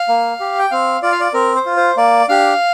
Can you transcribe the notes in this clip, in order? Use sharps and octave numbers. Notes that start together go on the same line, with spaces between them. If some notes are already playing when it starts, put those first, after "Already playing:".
Already playing: F5
A#3
G4
G5
C4 F5
F4 D5
F5
D5
C4 A#4
C5
F4
C5
A#3 D5
D4 G4 F5